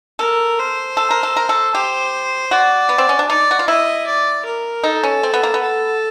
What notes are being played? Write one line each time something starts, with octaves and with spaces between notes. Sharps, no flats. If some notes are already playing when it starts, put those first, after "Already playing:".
A4 A#4
C5
A4
A#4
A4
A#4
A4
G4 C5
F#4 D5
B3
C4
C#4
D4
D#4 D5
F#4
F4
E4 D#5
D5
A#4
D#4 A4
C#4
C4
B3
A#3
B3
A4